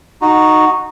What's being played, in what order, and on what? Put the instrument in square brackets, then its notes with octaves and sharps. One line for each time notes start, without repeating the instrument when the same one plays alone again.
[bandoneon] D#4 F#4